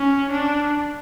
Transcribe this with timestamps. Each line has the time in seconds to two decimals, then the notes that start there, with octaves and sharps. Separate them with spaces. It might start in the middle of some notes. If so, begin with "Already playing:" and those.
Already playing: C#4
0.32 D4